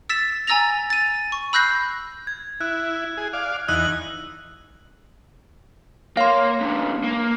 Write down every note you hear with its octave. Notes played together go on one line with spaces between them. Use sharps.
E6 A6 B6 E7
G#5 A#5 E6 A6 A#6 F7
A6 D#7
C#6
B5 E6 F#6 G6 A#6 C7
G#6
E4 F#6
G#4
D5 F5
E2 D#4 E6 F#6 F#7
A#3 C#5 F5 C6
A2 C#3 D4
A#3